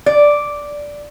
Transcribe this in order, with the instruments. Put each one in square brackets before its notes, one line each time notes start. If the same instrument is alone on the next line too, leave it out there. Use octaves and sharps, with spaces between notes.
[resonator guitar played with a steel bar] D5